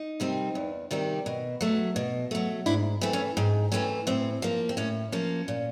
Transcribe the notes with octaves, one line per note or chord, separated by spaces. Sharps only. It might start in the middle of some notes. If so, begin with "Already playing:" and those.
Already playing: D#4
C3 D#3 G3 C4
E2
C3 D#3 G3 C4
B2
F#3 A3
B2
F#3 A3
G#2 D4 E4
E3 A3 C4
C#4
G#2 C4
E3 A3 C4 C#4
A2 C4
F3 A#3
C4
A2 C#4
F3 A#3 C#4
A#2